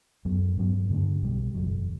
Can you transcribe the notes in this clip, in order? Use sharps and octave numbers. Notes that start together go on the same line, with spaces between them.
F#2 F#3 B3
G2 F#3 B3
G2 D3 A3 D4
B1 B2 G3
F#1 E2 B2 F#3